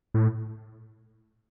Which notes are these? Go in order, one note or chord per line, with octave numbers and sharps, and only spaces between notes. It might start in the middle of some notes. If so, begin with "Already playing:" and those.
A2